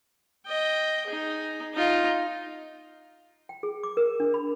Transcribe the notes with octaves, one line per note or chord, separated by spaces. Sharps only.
D#5 G5
D#4 G#4
D#4 F4
G5
G#4
D6
A#4
D4
B5